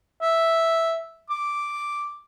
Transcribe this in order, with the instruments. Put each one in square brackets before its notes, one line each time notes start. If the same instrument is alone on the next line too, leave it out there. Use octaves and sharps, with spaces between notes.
[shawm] E5
D6